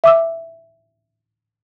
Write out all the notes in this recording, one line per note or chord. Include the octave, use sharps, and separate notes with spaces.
E5 D6 E6